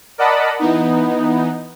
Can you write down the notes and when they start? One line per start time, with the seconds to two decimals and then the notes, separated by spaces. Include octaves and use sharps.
0.18 A#4 D5 D#5 F#5 A5 B5
0.59 E3 B3 D#4